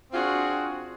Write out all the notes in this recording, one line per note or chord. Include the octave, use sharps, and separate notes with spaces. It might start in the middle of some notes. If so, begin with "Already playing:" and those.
C4 D4 F4 F#4 G#4